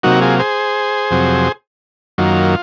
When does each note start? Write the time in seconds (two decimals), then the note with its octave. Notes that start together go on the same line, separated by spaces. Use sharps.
0.03 C3 F#3 A#3 D#4 F#4
0.21 F4 G#4
0.39 G#4 C5
1.11 F2 C3 F#3
2.18 F#2 D#3 F#3 A#3 F4